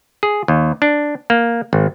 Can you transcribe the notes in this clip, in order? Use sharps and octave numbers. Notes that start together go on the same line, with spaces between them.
G#4
D#2
D4
A#3
G#1